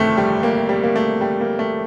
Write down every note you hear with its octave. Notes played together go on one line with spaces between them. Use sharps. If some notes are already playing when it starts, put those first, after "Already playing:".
Already playing: G1 F2 C3 D#3 A3
G3
A#3
G3
A#3
A3
G3
A#3
A3